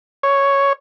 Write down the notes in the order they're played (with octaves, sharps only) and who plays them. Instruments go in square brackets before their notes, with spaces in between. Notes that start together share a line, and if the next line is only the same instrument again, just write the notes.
[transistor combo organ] C#5